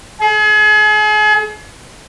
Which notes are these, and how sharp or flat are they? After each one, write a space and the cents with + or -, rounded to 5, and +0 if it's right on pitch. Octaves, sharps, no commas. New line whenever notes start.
G#4 +40